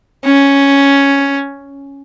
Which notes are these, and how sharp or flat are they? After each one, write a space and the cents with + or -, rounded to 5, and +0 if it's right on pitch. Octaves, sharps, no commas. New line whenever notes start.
C#4 +5